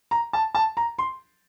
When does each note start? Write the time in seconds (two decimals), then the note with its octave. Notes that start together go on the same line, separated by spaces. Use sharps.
0.11 A#5
0.33 A5
0.55 A5
0.77 A#5
0.99 C6